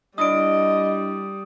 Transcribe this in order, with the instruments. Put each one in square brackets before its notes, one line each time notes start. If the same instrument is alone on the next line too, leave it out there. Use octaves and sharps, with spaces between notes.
[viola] G3 [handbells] D4 E4 D5 [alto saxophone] D#5 [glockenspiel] D#6 D7